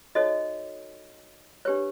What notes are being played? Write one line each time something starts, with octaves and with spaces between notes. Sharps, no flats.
D#4 F#4 A4 C#5 D#5
D4 G4 B4 C#5